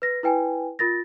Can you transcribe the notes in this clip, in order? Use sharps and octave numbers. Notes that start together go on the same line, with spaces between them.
B4 A#6
E4 B4 G5 G#5
F4 A#4 A6 A#6